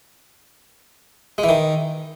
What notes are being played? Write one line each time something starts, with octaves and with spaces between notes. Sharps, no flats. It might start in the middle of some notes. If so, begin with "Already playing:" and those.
G#3
E3
D#3